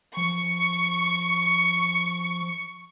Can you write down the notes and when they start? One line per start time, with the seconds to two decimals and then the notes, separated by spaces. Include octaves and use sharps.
0.17 F3 C#6